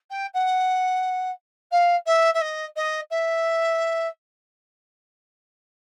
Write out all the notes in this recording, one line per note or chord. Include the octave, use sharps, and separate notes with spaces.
G5
F#5
F5
E5
E5
D#5
D#5
E5